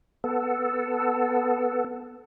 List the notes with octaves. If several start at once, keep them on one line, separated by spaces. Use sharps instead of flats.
B3 A4